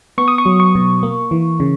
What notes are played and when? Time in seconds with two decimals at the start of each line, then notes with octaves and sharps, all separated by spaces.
0.18 B3 C#6
0.28 D#6
0.38 C#6
0.46 F#3
0.60 C#6
0.75 B2
1.03 A#3
1.31 E3
1.60 C#3